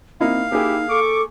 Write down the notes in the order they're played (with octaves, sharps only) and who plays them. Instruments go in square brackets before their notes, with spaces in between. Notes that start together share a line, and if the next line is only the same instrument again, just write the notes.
[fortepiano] A#3 D#4 E4 [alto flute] C4 [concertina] F5
[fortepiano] A#3 G#4 [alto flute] D#4 [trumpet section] E4 G4
[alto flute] A4 [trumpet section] C#6 D6